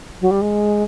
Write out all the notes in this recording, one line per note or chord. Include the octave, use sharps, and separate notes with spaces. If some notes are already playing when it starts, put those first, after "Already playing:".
F#3
G3
G#3